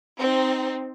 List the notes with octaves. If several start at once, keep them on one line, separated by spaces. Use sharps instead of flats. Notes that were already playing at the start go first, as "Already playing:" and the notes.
C4 D#4